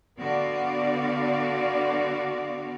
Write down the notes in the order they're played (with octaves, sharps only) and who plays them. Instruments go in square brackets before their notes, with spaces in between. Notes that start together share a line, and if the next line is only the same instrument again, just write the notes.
[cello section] D3 B3 F#4 D5 F5